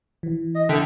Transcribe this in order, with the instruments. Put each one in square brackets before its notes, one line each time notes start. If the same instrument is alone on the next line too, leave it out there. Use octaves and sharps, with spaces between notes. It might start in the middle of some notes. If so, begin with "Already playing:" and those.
[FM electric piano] E3
[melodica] D#5
[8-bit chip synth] D3 [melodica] E5 G5